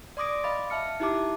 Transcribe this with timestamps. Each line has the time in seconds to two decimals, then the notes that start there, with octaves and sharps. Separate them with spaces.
0.17 D5 C6 D6 D#6 A#6 D7
0.44 D#5 F5 B5 D6 A6
0.70 E5 A5 F6 C#7
1.00 D#4 E4 G4 E5 A5 D6